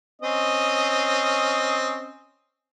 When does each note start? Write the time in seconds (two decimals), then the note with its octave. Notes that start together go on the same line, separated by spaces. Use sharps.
0.22 C4 C#4 D#5